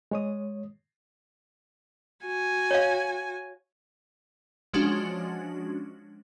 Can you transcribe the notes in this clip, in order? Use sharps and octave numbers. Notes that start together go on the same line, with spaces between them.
G#3 C#5 D#6
F#4 G#5
C#5 F5
F3 G#3 C#4 D4 F#4